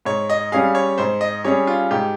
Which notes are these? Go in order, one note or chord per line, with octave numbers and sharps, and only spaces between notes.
G#2 C#5
D#5
G3 C#4 G#4 F5
C#5
G#2 C5
D#5
G3 C#4 G#4 C#5
F4
G#2 G4